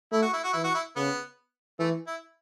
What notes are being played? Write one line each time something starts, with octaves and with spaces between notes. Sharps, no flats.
A3 E4
F#4
E4
F#4
E3 E4
F#4
E4
C#3 B3
E3 A3
E4